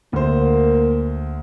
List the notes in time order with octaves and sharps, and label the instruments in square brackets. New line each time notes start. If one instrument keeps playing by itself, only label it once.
[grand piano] D2 C5 [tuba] A#3